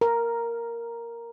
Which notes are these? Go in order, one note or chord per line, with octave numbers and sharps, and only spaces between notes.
A#4